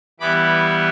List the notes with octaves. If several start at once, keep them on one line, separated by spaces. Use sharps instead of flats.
E3 G3 B3 E4 B5 D6